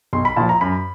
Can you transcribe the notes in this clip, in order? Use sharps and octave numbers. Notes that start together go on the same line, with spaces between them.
B1 C6
B5
A#2 F3 A5
A#5
F#2 B5